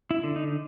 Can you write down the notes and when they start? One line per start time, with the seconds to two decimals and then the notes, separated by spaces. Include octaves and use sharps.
0.11 E4
0.24 D3
0.36 D#4